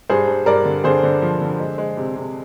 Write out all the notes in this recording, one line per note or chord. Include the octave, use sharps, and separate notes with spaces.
G2 G#4 C5
G2
G2 A#4 D5
D3
D3 G#4 C5
D3
F3
D3
G#3
G#3
C3
C3